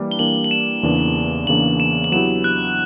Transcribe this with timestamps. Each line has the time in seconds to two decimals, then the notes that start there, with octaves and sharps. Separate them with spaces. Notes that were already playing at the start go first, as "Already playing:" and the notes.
Already playing: E3 G3 A#3 D4
0.11 G7
0.19 E3 G3 A#3 D4 G4 F#7
0.44 F#7
0.51 E7
0.83 E2 C#3 E3 A#3 D4
1.47 E2 C#3 E3 A#3 D4 F#7
1.80 E7
2.04 F#7
2.12 F#3 B3 E4 G4 E7
2.44 F#6